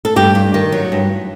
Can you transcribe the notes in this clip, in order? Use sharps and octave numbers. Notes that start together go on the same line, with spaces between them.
A4
G2 G4
G2
D#3
F#3
G2